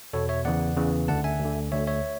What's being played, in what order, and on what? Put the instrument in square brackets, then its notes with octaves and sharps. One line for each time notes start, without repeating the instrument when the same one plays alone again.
[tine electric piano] E2 B2 A4 C#5
C#5 E5
E2 C#3 E3 D5 F#5
E2 C#3 E3
D2 D3 F#5 A5
E5 G#5
D2 D3
D2 D3 C#5 E5
C#5 E5